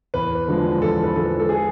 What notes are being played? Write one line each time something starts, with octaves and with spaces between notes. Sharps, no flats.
E2 B4
D3 F3 G#3
E2 A4
B4
D3 F3 G#3 A4
A4
G#4